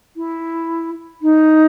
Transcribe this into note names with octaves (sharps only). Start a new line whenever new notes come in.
E4
D#4